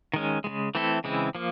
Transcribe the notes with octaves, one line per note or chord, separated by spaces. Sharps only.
D#3 G#3 C#4
C#3 E3 G#3
E3 A3 C4 E4 A4
C#3 E3 G#3 C4 E4
F3 A#3